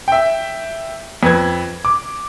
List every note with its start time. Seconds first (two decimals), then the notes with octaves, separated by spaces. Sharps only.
0.08 E5 G5
1.23 F2 B4 G#6
1.85 D6